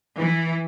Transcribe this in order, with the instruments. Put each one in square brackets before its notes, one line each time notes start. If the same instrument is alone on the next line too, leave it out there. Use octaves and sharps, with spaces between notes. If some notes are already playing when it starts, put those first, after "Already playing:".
[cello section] E3